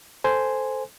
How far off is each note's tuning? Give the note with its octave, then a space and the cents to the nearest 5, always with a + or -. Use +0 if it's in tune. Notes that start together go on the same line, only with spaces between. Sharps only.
A4 +0 C5 -5 G#5 +0